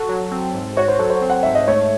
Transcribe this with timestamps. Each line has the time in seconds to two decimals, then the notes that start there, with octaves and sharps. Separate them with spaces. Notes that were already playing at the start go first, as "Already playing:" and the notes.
Already playing: F#4 A4
0.09 F#3
0.31 C4
0.54 G#2
0.76 F#4 C#5
0.88 C5
0.99 F#3 A4
1.10 C5
1.22 C4
1.30 F#5
1.43 G#2 E5
1.55 D#5
1.68 A3 C#5